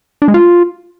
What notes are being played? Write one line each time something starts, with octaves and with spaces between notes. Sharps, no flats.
D4
G#3
F4